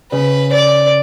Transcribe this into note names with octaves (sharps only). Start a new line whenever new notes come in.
C#3 B4
D5